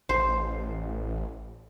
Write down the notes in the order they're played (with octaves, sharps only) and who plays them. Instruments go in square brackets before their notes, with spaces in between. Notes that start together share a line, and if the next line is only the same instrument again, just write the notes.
[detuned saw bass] A1 [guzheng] C5